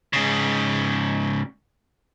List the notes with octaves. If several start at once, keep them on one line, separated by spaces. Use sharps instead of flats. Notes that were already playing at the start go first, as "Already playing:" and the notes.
G#2 C#3